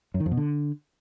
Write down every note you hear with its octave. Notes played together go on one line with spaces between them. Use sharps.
F#2
D#3
F2
B2
D3